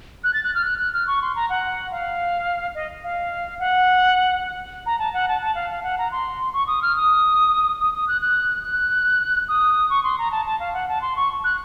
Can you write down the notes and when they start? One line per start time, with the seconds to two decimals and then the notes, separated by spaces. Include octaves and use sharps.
0.24 F#6
0.34 A6
0.44 F#6
0.55 F6
0.65 F#6
0.79 F#6
0.93 F6
1.07 C#6
1.22 C6
1.35 A#5
1.49 F#5
1.91 F5
2.75 D#5
3.04 F5
3.59 F#5
4.86 A#5
4.99 A5
5.13 F#5
5.28 A5
5.42 A5
5.55 F5
5.70 F5
5.83 F#5
5.98 A#5
6.12 C6
6.53 C#6
6.67 D#6
6.82 F6
6.96 D#6
7.80 D#6
7.94 D#6
8.08 F#6
8.21 F#6
8.64 F#6
9.48 D#6
9.90 C#6
10.04 C6
10.18 A#5
10.31 A5
10.46 A5
10.60 F5
10.73 F#5
10.89 A5
11.02 C6
11.16 C#6
11.44 F#6